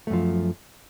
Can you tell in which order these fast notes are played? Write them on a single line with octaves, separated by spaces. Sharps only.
A3 F#2 F3